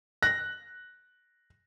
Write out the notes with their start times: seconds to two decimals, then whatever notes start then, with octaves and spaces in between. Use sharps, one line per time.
0.23 F#6 A#6